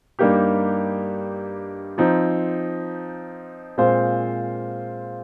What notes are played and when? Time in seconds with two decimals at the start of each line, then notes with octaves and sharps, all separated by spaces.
0.19 G2 G3 A#3 D#4 G4
1.98 F3 C4 D#4
3.78 A#2 G#3 C4 F4 C5